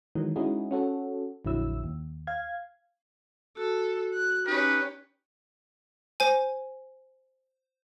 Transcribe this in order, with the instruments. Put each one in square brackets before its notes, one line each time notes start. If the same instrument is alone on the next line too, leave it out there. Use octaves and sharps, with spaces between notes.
[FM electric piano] D#3 E3 F#3 G#3 D#4
G#3 C#4 D#4 E4 F#4 G#4
C#4 F#4 A4
A#1 F2 D3 F#3 E4 E6
D#2
F5 G#6
[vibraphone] F#4 [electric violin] A4
[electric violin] F#6
[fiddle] C#4 G4 [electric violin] D#4 [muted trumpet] B4
[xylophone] C5 G#5